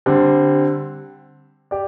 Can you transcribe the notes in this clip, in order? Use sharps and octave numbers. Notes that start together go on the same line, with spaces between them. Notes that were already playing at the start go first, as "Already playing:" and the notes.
D3 G3 C4
G4 D5